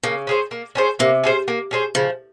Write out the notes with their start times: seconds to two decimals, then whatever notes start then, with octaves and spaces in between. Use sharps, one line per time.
0.03 C#3 A#3
0.27 C#4 G#4 C5
0.51 A#3
0.75 C#4 G#4 C5
0.99 C3 A#3
1.24 C#4 G#4 C5
1.48 A#3
1.71 C#4 G#4 C5
1.95 C#3 F3